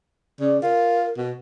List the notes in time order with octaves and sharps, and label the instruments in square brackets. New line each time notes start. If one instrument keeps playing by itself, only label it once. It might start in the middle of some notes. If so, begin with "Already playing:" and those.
[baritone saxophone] C#3 [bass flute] D5
[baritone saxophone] F4 [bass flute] A#4
[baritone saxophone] B2